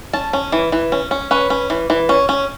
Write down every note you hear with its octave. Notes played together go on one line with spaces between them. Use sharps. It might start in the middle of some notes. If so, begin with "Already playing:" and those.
C#4 A5
C#4
E3
E3
C#4
C#4
C#4 B4
C#4
E3
E3
C#4
C#4